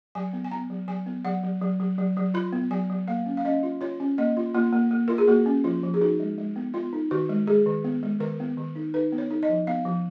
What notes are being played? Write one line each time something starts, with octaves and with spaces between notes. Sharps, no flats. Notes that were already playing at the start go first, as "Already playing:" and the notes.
F#3 G#5
B3
G#5
B3 A#5
F#3
F#3 G#5
B3
F#3 F#5
F#3
F#3
F#3
F#3
F#3
F4 B5
B3
F#3 G#5
F#3
A#3 F5
C#4
F5
C#4 D#5
F4
F4 C#5
C#4
A#3 D#5
F4
A#3 F4
A#3
A#3
F4 A#4
G#4
A#3 F#4
C#4
F3 F4
F3
G#4
D#4 F#4
G#3
G#3
B3
B3 F4
D#4
D#3 F#4
G#3
G#3 G#4
D#3
B3
G#3
D#3 A#4
B3
D#3
D#4
D#4 B4
B3
C#5
D#4
D#5
F3
B3 F5
F3